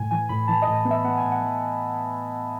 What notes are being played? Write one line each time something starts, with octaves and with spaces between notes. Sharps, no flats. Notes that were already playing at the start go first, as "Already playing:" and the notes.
Already playing: A2 G#5
E3 G#5
A2 B5
E3 A5
D#5
A2
D#5
B3
E5
B3 F#5
A2 G#5
F#5
E3
F#5